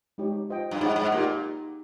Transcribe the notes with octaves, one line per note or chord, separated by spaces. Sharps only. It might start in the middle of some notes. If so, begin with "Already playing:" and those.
G#3 D#4 G4 C#5
F4 C5 D#5 G5
G2
G#2 D#4 G#4 C#5 G5
G#2
A#2 A#3 D#4 G4